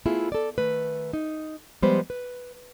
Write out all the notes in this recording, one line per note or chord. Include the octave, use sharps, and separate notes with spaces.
A3 B3 E4 F4 G#4
A4 D5
D#3 A3 B4
D#4
F3 G3 G#3 B3 B4 C5
B4